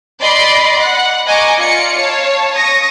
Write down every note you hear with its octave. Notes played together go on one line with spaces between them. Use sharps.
D5 D#5 B5 C6
F#5
D#5 G#5 A#5 C#6 D6
F4 D5 C#7
C#5 F5 A5
C#6 D#6 A#6